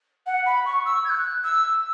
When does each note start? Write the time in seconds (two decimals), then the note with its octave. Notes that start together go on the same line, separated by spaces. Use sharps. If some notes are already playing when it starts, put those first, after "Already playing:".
0.26 F#5
0.46 B5
0.65 C#6
0.85 E6
1.04 G#6
1.09 F#6
1.44 E6